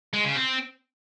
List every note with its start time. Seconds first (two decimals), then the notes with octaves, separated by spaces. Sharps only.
0.13 G#3
0.24 C#3
0.36 C4